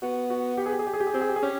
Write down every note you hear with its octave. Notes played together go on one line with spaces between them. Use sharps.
B3 F#4
F#4
G4
G#4
G4
G#4
G4
G#4
G4
G#4
C4 G4
G#4
G4
G#4
C#4 G4